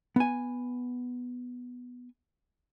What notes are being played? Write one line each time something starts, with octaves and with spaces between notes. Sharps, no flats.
B3 G#5